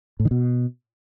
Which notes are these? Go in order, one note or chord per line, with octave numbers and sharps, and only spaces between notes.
A2
D#3
B2